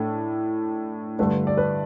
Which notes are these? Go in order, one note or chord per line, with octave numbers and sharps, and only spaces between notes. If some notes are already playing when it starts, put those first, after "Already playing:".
Already playing: A2 A3 D4 A4
G2 D3 A3 D4 B4
D5
B4